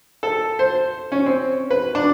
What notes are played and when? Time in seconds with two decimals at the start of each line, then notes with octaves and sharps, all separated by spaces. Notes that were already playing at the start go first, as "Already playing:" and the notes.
0.23 A4
0.59 C5
1.12 C#4
1.26 C4
1.70 B4
1.95 D4